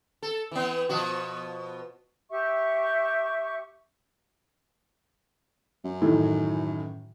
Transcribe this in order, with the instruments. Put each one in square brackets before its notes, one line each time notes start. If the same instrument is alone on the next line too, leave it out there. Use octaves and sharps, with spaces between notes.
[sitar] A4
E3 B3
B2 F3 F#4
[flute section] G4 E5 C#6
[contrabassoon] F#2
[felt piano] A2 D#3 E3